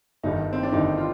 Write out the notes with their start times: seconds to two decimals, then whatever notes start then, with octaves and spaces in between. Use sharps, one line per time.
0.23 G1 G2 D#3 G3 D#4
0.53 C4
0.63 D4
0.72 G1 G2 D#3 G3 D#4
0.97 F4